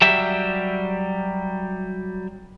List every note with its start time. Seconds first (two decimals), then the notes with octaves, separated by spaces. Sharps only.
0.02 F#3 G3 G4 E5